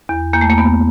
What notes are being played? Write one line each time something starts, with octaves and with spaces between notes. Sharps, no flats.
E2
E2 A#3
A3
A#3
E2 B3